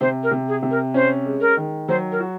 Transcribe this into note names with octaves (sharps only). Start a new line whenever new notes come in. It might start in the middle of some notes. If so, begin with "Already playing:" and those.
C3 C5
A#4
C3
G#4
C3
A#4
C#4 C5
G#3
A#4
D#3
F#3 C5
A#4
F#4